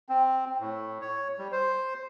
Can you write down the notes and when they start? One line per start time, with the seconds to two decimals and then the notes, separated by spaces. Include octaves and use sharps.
0.09 C4
0.60 A2
1.01 C#5
1.38 G3
1.52 C5